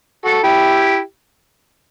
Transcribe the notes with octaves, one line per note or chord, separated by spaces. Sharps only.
F#4 A4
E4 G4